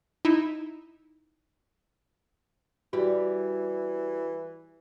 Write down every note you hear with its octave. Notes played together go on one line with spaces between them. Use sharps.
D#4 E4
E3 G3 F#4